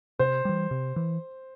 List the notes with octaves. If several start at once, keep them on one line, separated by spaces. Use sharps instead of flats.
C3 C5
E3 G3
C3
E3